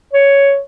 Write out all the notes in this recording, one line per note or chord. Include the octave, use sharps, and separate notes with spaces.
C#5